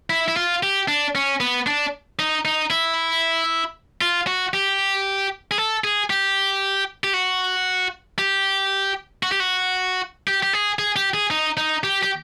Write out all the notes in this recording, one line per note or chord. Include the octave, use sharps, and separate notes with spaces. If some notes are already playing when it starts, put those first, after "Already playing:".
E4
E4
F4
G4
D4
C#4
B3
D4
D#4
D#4
E4
F4
F#4
G4
G#4
A4
G#4
G4
G4
F#4
G4
F#4
G4
F#4
G4
G4
G#4
G#4
G4
G#4
D#4
D#4
G4
G4